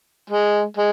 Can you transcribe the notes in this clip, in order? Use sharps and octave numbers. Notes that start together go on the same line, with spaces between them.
G#3
G#3